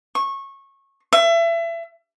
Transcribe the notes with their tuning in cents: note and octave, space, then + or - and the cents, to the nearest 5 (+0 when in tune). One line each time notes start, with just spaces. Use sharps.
C#6 -20
E5 +30